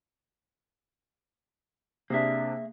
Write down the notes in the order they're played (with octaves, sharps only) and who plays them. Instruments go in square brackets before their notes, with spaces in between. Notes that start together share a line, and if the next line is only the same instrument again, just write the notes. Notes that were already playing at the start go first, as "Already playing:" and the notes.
[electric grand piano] C3 D4 [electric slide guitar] A#3 G#4 E5